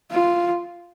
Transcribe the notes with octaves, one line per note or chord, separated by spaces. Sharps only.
F4